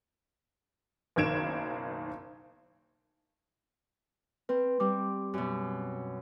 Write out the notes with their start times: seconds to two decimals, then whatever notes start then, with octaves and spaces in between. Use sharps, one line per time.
1.16 F#1 B1 D#3 G#6 D7 E7
4.49 C4 B4
4.80 G3 C4 D6
5.34 F#2 B2